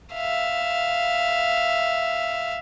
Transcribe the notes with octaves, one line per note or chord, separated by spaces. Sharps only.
E5 F5